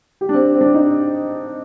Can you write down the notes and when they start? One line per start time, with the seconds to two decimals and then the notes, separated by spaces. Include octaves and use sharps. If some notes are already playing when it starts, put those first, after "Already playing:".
0.21 G4
0.29 D4
0.34 C4
0.55 C4
0.61 D4
0.75 D#4